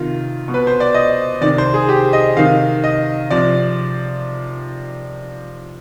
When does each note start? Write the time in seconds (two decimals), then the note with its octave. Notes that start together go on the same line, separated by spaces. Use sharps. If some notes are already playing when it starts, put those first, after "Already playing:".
Already playing: C3 D#3 F4
0.48 B2
0.54 B4
0.67 C5
0.80 D5
0.94 D#5
1.41 C3 D#3 D5
1.58 C5
1.74 G#4
1.89 G4
2.13 D#5
2.37 C3 D#3 F5
2.84 D#5
3.30 C3 F3 D5